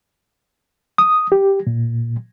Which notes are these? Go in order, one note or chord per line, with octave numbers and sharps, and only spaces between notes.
D#6
G4
A#2